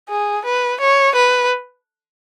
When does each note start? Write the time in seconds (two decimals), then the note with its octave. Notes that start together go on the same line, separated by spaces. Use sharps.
0.09 G#4
0.45 B4
0.80 C#5
1.15 B4